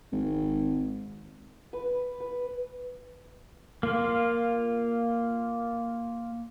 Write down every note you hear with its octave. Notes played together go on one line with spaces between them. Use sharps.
G#1
B4
B4
A#3 F4